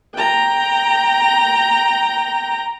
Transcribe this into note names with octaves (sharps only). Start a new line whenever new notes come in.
G5 A#5